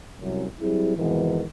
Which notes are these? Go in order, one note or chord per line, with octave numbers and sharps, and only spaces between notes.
C2 F#2
F#3 G3 C4 E4 G#4
F2 G#2 B2 D#3 E3